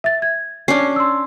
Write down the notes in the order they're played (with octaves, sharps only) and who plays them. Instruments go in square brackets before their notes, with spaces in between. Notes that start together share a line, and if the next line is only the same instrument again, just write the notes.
[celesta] E5 A6
G#6
[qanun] C#4 D4 [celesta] C7
[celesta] C6 E6